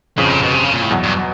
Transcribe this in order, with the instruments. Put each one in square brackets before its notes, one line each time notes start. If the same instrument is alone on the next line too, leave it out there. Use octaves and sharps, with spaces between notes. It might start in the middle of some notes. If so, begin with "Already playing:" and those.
[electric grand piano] G1 F2 C#3 F3 [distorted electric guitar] A2
[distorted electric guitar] A#2
B2
C3
C#3
A#2
A2
[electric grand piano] E2 B2 F#3
[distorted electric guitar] G2